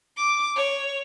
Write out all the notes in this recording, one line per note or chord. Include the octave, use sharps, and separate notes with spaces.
D6
C#5